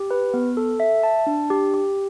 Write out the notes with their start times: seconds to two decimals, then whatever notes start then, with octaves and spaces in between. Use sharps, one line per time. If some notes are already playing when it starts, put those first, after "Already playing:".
Already playing: G4
0.11 B4
0.34 B3
0.57 A4
0.80 E5
1.03 A5
1.27 D4
1.50 G4
1.74 G4